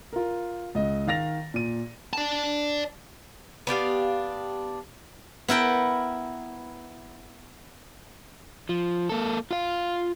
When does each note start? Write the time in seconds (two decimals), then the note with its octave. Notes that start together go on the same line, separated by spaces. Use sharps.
0.13 F4 A#4
0.75 C#2 D#5
1.07 D#3 F5 A6 A#6 F7
1.54 A#2 D#7
2.13 D5 A5
3.67 B3 D4 G4 F5
5.48 B3 E4 A#4 G5
8.69 F3
9.09 A#3 A4
9.51 F4 F5